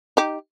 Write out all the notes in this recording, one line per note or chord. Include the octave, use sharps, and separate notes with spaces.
D#4 G4